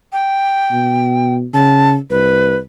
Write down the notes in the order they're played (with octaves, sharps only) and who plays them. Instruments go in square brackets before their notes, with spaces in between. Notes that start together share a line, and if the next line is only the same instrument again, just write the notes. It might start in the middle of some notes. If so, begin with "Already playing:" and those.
[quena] G5
[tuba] B2
[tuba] C#3 [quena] A5
[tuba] C2 [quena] B4